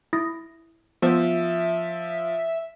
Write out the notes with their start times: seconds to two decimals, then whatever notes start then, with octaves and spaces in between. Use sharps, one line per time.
0.13 E4 D#6 A#6
1.02 F3 B3 C5 E5